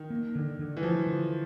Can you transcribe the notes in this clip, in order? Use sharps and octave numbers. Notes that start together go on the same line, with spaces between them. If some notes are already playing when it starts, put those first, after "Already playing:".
Already playing: D#3
A#3
D3
D3
E3
F3 F#3
D3